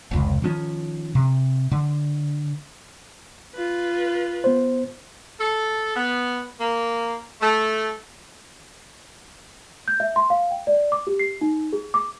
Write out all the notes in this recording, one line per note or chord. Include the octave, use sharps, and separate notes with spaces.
F1 C#2
D#3 F3 C#4
C3
D3
F4 B4
B3 C5
A4
B3
A#3
A3
G6
E5
C6
F5
G5
D5
D6
G4
C7
D#4
G#4
D6